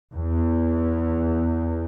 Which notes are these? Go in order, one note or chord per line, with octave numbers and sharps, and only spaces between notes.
E2